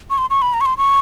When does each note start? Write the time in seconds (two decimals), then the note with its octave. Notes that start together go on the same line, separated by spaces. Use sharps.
0.10 C#6
0.18 C6
0.30 C#6
0.42 B5
0.54 A#5
0.61 C#6
0.66 C6
0.78 C#6